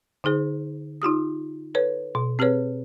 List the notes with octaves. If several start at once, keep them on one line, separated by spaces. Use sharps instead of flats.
D3 D#4 G#4 C5
D#4 F4 G4 D#6
A4 B4 C#5
B2
C4 G4 G#4 B4 C#5